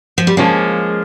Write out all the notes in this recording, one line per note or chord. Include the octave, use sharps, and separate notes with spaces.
F3
G3
F3 G#3 A#3 C#4